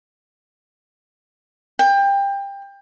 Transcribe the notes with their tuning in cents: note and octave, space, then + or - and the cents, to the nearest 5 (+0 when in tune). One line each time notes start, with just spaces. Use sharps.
G5 +25